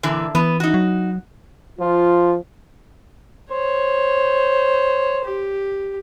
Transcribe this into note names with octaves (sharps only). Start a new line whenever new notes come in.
A#2 D3 E3
E3 B3
D#4 F#4
F#3
F3 F4
C5 C#5
G4